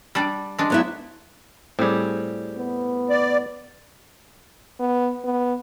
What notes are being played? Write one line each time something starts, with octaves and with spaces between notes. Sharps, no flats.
G3 D4 D5
G#3 D4
F#3 B3 E4
A2 G3 C4 G#4
B3
D5
B3
B3